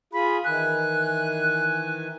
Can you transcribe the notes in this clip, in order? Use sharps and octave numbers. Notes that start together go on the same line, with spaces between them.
F4 G#4 B5
D#3 E3 G#5 F#6